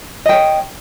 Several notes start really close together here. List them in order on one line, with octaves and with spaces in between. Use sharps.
D#5 G5 C#5